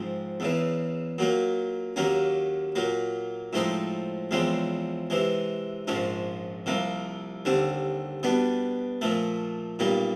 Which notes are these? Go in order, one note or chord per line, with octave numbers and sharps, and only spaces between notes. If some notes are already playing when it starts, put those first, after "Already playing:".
Already playing: G#2 F3 G#3 C4
E2 C#3 E3
A#2 F#3 A#3
D#2 D#3 F#3 A#3 C#4
A#2 F#3 A#3
A2 F3 G#3 C4 D#4
E2 C#3 F3 G#3 C4
C3 E3 G#3
A#1 G#2 F3 G#3 C#4
C2 C3 F3 A#3
D#2 D3 G3 C4
B2 G3 B3 D4
A#2 F3 A3
B1 A#2 G3 A#3